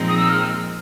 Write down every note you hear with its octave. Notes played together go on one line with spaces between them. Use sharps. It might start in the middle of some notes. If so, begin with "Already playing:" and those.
Already playing: A#2 F3 G#3 C4 D#4
D#6
E6
F6